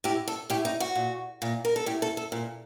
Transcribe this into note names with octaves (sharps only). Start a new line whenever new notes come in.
A2 G4
A4
A2 G4
D#4
F#4
A#2
A#2
A#4
A4
A2 G4
A4
A4
A#2